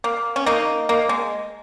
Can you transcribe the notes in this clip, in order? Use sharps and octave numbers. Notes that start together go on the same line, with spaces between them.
A#3
C#4
A#3 D#4
A#3
G#3